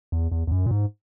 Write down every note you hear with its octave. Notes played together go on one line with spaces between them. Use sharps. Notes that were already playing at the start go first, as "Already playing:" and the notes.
E2
E2
E2
F#2
A#2
G#2